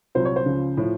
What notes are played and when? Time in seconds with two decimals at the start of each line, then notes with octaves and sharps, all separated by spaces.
0.15 C2 A#2 F#3 C5
0.25 C#5
0.36 C5
0.45 C#2 C#3 F3
0.77 A2 F3